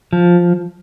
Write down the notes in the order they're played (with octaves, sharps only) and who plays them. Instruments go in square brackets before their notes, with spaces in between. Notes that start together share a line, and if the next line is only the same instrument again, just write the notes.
[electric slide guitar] F3